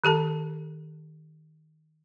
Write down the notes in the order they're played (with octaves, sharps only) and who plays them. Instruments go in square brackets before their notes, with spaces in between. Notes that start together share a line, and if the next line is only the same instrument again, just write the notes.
[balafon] D#3 G4 A4 A5